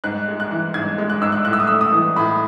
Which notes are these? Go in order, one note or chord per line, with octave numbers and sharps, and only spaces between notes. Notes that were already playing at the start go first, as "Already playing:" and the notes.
G#2 F#6
G#3
F#6
E3
G#2 G#6
G#3
F#6
G#2 E6
F#6
A2 F#6
E6
D#6
A3 E6
D#6
E3
A2 B5